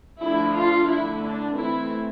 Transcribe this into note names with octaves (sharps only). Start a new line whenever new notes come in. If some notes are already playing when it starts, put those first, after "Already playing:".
D3 F3 A3 D4 E4
F4
D3 A3 D4 E4
D4
E3 A3 C4 E4